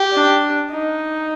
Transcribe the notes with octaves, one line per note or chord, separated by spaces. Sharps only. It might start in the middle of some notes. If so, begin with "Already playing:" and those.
Already playing: G4
D4
D#4